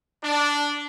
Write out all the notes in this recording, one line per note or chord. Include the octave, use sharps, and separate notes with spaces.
D4